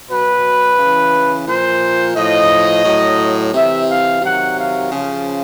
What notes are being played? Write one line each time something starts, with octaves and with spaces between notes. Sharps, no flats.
B2 F#3 B4
C#3 E3
A#2 F3 C5
A2 F3 D#5
A2 F#3
C3 E3 E5
F5
C3 D#3 F#3 F#5
F5
C#3 F3